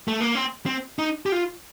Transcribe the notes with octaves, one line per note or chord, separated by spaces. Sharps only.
A3
A#3
C4
C4
D#4
G4
F4